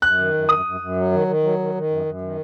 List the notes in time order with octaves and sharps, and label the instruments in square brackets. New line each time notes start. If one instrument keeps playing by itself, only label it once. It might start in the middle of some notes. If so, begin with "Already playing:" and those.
[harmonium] F#2 [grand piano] F#6
[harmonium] D#3
F#2
[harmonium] F#2 [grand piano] D#6
[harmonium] F#2
F#2
F#3
D#3
D#3
F#3
D#3
D#3
F#2
F#2
D#3